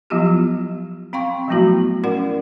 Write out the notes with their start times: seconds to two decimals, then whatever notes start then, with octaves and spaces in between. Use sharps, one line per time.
0.10 F3 F#3 B3 E4 F4 G4
1.13 C4 F5 G5 C6 C#6
1.48 F3 F#3 A3 B3 E4 F#4
2.04 C#4 E4 A#4 D5 F#5